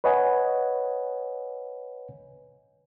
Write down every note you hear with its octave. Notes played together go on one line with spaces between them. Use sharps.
B4 C#5 D#5 F#5 G#5